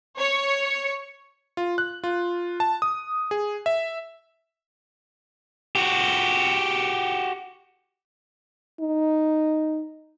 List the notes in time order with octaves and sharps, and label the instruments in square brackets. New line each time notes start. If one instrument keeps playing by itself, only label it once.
[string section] C#5
[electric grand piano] F4
F#6
F4
A5
D#6
G#4
E5
[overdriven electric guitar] F#4 G4
[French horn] D#4